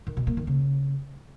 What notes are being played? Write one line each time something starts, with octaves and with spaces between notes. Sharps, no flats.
D#3
B2
A#3
D#3
C#3